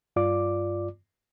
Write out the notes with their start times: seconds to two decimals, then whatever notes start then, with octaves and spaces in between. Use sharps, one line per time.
0.16 G2 F4 D5 D6